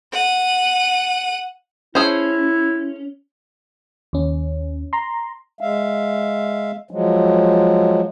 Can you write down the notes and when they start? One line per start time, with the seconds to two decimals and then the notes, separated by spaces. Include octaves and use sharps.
0.13 F#5 D#7
1.95 A3 C#4 E4 G#4 C5
4.13 D#2 C#4
4.93 A#5 C6
5.61 G#3 E5 F5
6.91 F3 F#3 G#3